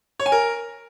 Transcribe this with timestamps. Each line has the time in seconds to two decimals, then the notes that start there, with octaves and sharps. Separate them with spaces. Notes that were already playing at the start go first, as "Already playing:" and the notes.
0.20 C#5
0.26 G#5
0.32 A#4